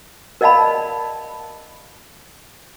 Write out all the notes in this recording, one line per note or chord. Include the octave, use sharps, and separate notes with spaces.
A#4 D5 D#5 F5 A5 B5